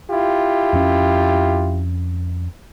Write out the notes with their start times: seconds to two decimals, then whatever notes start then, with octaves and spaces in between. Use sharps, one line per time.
0.10 E4 F4 G4
0.73 F2 C#4